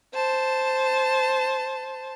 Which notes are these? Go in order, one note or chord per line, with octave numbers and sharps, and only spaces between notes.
C5 A5